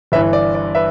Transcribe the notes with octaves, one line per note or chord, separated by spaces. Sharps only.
G1 G2 E3 B4 E5
D5
D5
B4 E5